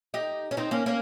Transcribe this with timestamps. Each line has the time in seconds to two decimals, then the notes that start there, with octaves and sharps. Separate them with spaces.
0.14 D#4 G4
0.51 C#4
0.57 C4 D#4
0.71 A#3 C#4
0.86 A#3 C#4